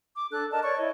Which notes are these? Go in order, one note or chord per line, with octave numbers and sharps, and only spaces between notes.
D6
D4 A4 F#6
A#4 D5 D#5 A5
C#5 D5 C#6
E4 C#5 D#5